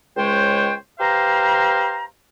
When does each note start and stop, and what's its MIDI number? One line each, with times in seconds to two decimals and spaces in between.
0.17 0.74 37
0.17 0.74 56
0.17 0.74 72
0.17 0.74 73
0.17 0.74 79
0.99 2.04 67
0.99 2.04 71
0.99 2.04 72
0.99 2.04 77
0.99 2.04 82